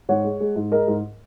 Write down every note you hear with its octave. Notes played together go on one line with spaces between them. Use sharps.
G#2 C#5 F#5
G#3
G#3
G#2
G#3 A#4 D#5
G#2